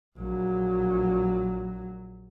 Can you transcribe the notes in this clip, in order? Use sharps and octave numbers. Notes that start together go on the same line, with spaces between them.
A#1 F#3